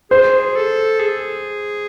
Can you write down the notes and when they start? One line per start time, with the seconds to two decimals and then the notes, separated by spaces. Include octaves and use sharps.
0.11 G#4 C5
0.56 A4
1.00 G#4